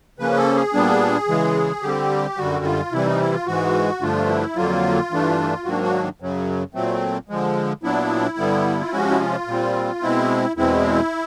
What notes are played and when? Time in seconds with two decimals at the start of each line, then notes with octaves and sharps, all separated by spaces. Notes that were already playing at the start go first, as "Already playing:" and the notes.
0.19 C#3 F3 A#3 C#4 B4
0.37 A4
0.55 G#4
0.73 A#2 G3 B3 D4
1.28 C#3 E3 G#3
1.82 D3 G3 C4 G4
2.37 F#2 D3 G3 F#4
2.65 F4
2.92 C3 E3 G3 E4
3.06 D#4
3.20 E4
3.33 F4
3.47 G#2 E3 G#3 F#4
4.01 G2 D3 F3 A3 D4 F4
4.29 E4
4.56 F2 D3 F#3 A#3 F4
5.10 G2 E3 A3 D4
5.65 G#2 D#3 F#3 A#3 D4 F#4
5.83 F#4
6.20 F#2 C#3 F#3
6.74 A#2 F#3 A3 C4
7.29 D3 F3 G#3
7.83 A#2 F#3 B3 D4 E4
8.38 G2 D3 G3 B3
8.81 F4
8.93 C3 F3 G#3 C#4 F#4
9.11 E4
9.20 F4
9.47 A#2 G3 C4
10.02 B2 G#3 C4 E4
10.57 E2 B2 G#3 C4 E4